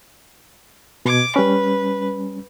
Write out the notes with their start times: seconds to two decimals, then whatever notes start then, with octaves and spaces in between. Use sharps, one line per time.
1.05 B2 D6 G#6
1.36 G3 C#4 B4